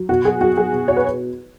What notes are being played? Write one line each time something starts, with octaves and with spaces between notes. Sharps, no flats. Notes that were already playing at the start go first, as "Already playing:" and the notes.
Already playing: F#3
B2 F#4
F#3 G#4
F#3 F#4
F#3 G#4
B2
B2 C#5
B4